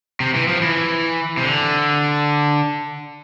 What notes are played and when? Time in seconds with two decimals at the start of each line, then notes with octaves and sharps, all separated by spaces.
0.20 C3
0.34 E3
0.48 F3
0.62 E3
1.37 C3
1.44 D3